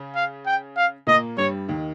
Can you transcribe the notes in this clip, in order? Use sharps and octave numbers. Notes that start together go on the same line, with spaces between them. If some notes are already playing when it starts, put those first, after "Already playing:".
Already playing: C#3 C#4
F5
G5
F5
A#2 A#3 D#5
G2 G3 C#5
D#2 D#3